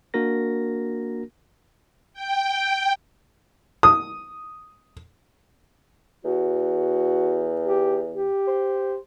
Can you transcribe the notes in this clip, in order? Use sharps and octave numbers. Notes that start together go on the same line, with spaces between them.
A#3 D4 F#4 A#4 A#6
G5
D#6
E2 F#4
G4
G4
C5